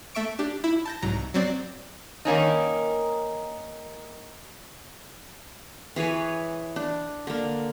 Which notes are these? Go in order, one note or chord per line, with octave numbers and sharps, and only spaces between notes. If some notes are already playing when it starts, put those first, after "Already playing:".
A3 E5 C#6 D7
D4 G4
E4
A5 G6 A#6
C2 G#2 F#3 A#5
F#3 C4 D5
D#3 A#3 C#4 D#4
E3 G#4 B4 C#5
D4
D3 A#3